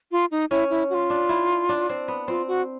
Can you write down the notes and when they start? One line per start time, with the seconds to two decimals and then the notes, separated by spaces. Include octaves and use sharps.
0.12 F4
0.31 D#4
0.50 C#4 E4
0.70 E4
0.90 F#4
0.94 F4
1.10 D4
1.29 E4
1.69 D4
1.89 C4
2.08 B3
2.28 C4 F4
2.48 F#4